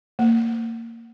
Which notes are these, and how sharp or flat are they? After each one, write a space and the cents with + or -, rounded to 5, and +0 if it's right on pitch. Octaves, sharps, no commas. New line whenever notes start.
A#3 -20